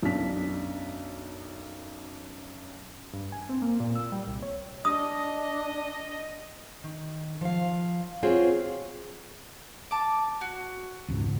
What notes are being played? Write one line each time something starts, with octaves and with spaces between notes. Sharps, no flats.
B1 F#2 D4 B6
G2
G#5
C4
A#3
A#2
E6
G3
C2
C#5
D4 D#5 D#6
D#3
F3 F5
C4 F4 F#4 G#4 C#5
A5 D6
F#4
E1 C#2 G#2